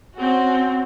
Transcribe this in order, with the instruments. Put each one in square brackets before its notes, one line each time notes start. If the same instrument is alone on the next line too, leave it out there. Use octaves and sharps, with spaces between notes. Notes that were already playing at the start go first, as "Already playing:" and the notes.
[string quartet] C4 C#4 F#4